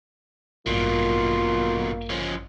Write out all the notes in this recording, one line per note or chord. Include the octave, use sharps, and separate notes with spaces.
A1 G2 B2 D#3 A#3 F4
F3 C#4